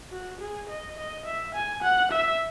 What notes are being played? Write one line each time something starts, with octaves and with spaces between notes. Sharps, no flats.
F#4
G#4
D#5
D#5
E5
G#5
F#5
E5